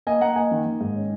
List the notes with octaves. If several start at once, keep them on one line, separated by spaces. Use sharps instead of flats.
A#3 D#5 G#5
A#3 F#5 A#5
A#3 D#5 G#5
D#3
D#3
G#2
C#4